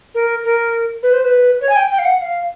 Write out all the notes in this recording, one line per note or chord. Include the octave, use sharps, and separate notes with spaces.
A#4
A#4
B4
C5
B4
C#5
G#5
G5
G5
F5
F#5
F5